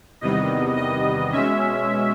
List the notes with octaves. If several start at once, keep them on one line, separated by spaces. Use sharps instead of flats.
E2 C3 D#3 G3 B3 D#5
D#5
B2 G#3 C#4 E5